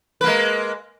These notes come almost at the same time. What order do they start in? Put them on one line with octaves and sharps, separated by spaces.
B4 A#3 G#3